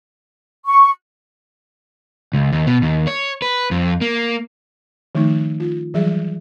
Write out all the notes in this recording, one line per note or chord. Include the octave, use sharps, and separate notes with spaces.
C#6
C#2
D#2
B2
D#2
C#5
B4
F2
A#3
D#3 F3 A3 D#4
F4
E3 F#3 G3 G#4 E5